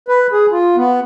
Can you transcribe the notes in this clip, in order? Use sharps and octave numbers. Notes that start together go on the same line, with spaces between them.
B4
G#4
F4
B3